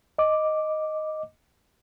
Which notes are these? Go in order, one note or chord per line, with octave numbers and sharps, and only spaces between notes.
D#5 D6